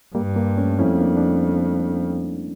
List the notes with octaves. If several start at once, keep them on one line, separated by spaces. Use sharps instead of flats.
G2 G3 A#3
G3 A#3
A3 C#4
F2 C#4 E4
A#3 D4
D4